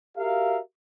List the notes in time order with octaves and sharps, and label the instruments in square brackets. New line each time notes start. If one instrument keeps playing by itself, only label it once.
[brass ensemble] F#4 G4 A#4 E5 F5